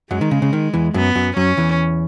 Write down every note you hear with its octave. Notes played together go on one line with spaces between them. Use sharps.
F#2 F#3 G#3
D#3
C#3
C#3
D#3
E2 E3
F#2 F#3 B3
F#2 F#3
F#2 F#3 C#4
E2 E3